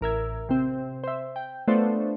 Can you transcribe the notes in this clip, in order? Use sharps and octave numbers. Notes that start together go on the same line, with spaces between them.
A1 A#4 E5 G#6
C3 C4
C5 E5
G5
A3 B3 D4 F4 C5